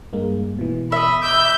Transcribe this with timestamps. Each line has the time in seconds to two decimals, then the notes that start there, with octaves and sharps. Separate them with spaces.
0.13 G2 G#3 A#3
0.59 B2 E3
0.92 D#5 E5 B5
1.23 D6 E6 G6